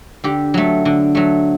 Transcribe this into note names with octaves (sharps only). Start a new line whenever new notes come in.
D3 G4
F#3 A3
D3
F#3 A3